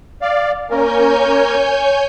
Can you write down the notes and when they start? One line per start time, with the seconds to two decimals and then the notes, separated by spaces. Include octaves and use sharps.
0.22 D5 F5
0.70 A#3 C#4 A#4 C#5 G#5 G6